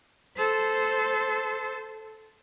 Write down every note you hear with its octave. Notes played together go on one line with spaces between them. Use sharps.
A4 C5